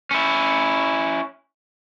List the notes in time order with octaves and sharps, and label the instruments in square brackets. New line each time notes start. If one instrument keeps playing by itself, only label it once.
[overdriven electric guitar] C#4 E4